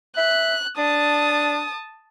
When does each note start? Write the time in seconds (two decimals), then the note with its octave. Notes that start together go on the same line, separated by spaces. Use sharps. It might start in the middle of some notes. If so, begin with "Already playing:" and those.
0.17 E5 F#6
0.78 D4 A5 D#6